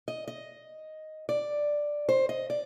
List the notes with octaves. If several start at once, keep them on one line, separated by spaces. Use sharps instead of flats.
D#5
D#5
D5
C5
D#5
D5